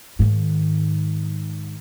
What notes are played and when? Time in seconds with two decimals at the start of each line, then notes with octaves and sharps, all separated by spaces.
0.19 G#2 D#3